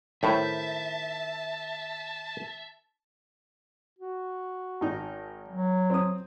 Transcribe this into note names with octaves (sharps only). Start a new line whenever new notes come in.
A2 D#3 B4 C5 E5 A5
F#4
G#1 D#4
F#3
C4 D#6